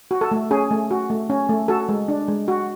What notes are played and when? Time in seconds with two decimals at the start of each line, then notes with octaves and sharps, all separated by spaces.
0.11 F#4
0.21 A4
0.31 A3
0.51 C#4 G#4
0.71 A3
0.91 F#4
1.10 A3
1.30 C#4
1.49 A3
1.68 F#4 A4
1.89 G#3
2.08 D4
2.28 G#3
2.48 F#4